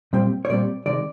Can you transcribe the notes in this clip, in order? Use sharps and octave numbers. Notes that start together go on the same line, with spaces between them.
A#2 G3 C4
C#5
A#2 G3 C4 D5
C3 D#3 G#3 D5